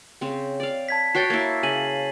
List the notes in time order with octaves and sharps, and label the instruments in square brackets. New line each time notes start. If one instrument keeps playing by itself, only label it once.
[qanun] C#3 C4
D5 F5
[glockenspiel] A5 G#6 B6
[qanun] F#4 C#5 G5 [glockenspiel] A6 C7
[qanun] A#3 E4 [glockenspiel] G#6
[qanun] C#3 [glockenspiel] G#5 D#7 F#7